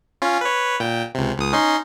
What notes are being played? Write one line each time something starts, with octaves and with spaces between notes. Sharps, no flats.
C#4 F4
B4 C#5
A#2 G5
C#2 C3
C#2 D#6
C#4 D#4 C6